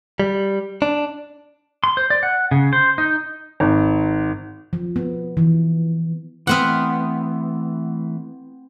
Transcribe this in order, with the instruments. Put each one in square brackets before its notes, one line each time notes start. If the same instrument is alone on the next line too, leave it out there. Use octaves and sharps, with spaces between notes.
[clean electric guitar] G3
D4
[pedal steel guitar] C6
C5
D5
F#5
C#3
C5
D#4
[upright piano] G#1
[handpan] F3
B3
E3
[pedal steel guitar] E3 A3 F6 [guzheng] B3 C4 F#5